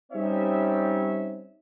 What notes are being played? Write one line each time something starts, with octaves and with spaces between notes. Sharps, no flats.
G3 C4 C#4 D#4 C#5 E5